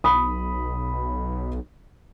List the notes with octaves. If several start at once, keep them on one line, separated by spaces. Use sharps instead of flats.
B1 B5 D#6